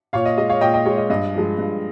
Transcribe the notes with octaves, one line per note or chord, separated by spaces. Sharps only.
A#2 C#5 F5
D#5
G#3 D#5
C#5 F5
A#2 D#5 G5
D#5 G5
G#3 C#5
D#5
G2 D#5
F3 G#3
G2